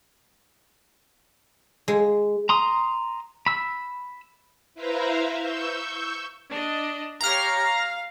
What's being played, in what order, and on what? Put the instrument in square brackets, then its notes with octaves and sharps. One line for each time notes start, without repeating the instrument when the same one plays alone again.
[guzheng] G#3
[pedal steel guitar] A#5 C6 D#6
B5 E6
[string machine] E4 B4 C5 E5 F5 A#5
C#6 E6 G6
[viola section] D4 D#5
[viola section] G4 C#5 F5 [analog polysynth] A#5 F6
[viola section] F5